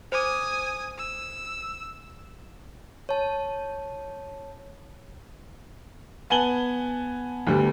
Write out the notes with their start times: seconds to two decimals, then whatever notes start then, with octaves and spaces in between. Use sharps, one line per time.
0.12 C5 G#5 D6 D#6
0.98 E6
3.09 C#5 A5
6.30 B3 G#5 A5 F#7 G7
7.47 D2 D3 G3 B3